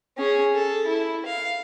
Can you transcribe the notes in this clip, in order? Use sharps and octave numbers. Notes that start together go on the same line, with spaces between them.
C#4 G#4
A4
E4
F5